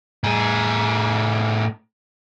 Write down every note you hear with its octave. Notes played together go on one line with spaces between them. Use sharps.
A2 G#4